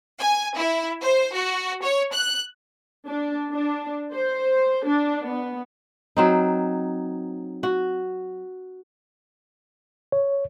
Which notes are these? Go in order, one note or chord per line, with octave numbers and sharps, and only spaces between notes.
G#5
E4
C5
F#4
C#5
F#6
D4
D4
C5
D4
B3
F#3 C4 D#4
F#4
C#5